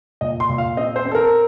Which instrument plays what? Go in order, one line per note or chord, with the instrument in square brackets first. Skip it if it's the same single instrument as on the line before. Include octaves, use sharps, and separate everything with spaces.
[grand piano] A#2 D#5
C6
A#2
F5
C4 D#5
C5
C4
A4
A#4